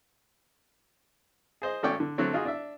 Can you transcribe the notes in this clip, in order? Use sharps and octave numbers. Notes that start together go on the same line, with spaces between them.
G#4 C5 D#5
G#1 A3 C#4 D5 G5 C#6
D3
D3 F#3 A3 C4 C#5
D#4 F4 F#4 G#4
D4 E5